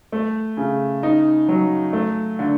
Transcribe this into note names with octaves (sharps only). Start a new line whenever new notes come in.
A3
C#3
D#4
F#3
A3
D3